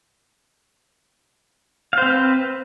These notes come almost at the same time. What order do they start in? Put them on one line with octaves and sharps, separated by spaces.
F5 C5 C4 B4